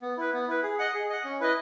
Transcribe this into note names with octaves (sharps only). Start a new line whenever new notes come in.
B3
E4 B4
B3
E4 B4
G#4
D#5 F#5
G#4
D#5 F#5
C#4
E4 B4 D#5